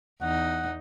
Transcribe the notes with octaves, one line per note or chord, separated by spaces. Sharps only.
E2 D#4 F#5